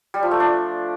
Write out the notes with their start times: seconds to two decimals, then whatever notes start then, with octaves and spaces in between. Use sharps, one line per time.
0.14 G3
0.23 F3
0.31 A3
0.40 D4